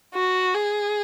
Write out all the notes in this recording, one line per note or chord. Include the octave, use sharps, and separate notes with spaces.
F#4
G#4